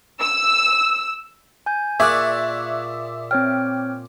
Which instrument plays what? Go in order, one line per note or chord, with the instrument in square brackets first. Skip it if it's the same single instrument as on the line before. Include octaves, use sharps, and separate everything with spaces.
[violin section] E6
[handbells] G#5 G6
[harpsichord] A#2 G#4 D5 [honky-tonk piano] E5 [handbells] C#6 [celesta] F#6 G#6
[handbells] C4 C#5 G5 [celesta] F6